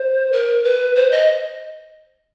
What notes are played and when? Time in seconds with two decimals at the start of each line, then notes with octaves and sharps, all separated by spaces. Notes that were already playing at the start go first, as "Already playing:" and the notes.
Already playing: C5
0.33 A#4
0.64 B4
0.95 C5
1.11 D#5